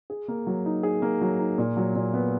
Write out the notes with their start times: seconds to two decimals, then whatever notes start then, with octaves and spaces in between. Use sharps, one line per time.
0.10 G#4
0.28 A#3
0.47 F#3
0.66 D#4
0.83 G#4
1.02 A#3
1.21 F#3
1.39 D#4
1.58 A#2
1.77 F#3
1.95 A#2
2.14 B3